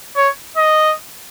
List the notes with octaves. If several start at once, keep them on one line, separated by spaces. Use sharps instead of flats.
C#5
D#5